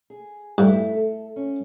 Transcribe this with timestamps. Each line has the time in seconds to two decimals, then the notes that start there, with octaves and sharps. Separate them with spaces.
0.10 G#4
0.58 G2 A3 E4
0.95 A4
1.36 C#4